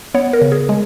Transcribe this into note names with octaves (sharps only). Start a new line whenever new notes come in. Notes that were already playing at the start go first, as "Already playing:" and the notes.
B3 C#5
A#4
C#3
G#4
G#3